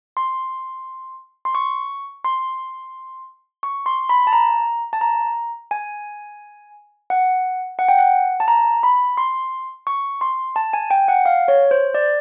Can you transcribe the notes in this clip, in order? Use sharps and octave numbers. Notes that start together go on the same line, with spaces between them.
C6
C6
C#6
C6
C#6
C6
B5
A5
A#5
A5
A#5
G#5
F#5
F#5
G5
F#5
A5
A#5
B5
C6
C#6
C6
A5
G#5
G5
F#5
F5
C#5
C5
D5